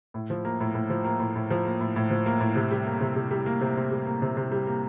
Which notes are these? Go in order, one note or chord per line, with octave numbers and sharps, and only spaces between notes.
A2
F3
A#3
A2
A2
F3
A#3
A2
A2
F3
A#3
A2
A2
F3
A#3
A2
C3
G3
A#3
C3
C3
G3
A#3
C3
C3
G3
A#3
C3
C3
G3
A#3